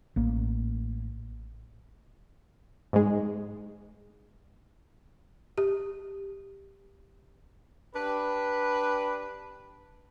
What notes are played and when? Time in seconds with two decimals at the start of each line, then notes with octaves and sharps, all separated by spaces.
0.16 A1 A#3
2.93 G#2 G#3
5.58 G4
7.94 D4 G4 B4